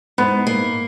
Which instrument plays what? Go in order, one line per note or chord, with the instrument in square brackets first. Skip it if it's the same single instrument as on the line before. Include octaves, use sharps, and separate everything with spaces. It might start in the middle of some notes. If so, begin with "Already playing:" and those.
[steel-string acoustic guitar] G#2 [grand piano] B3 B4
[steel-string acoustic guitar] A#3